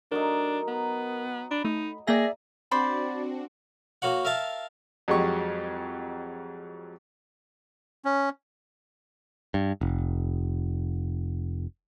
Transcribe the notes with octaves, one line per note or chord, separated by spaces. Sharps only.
F#3 A3 D4 D#4 A#4
B3 A#5
D4 B5
A3 D#4
A#3 G#4 D5 E5 G5 A#6
C4 D4 F#4 C5 D5 B5
A#3 F#4 C#5 F#5
A#4 E5 F5 A5
F2 F#3 G#3 G4 C#6
C#4
G2
F1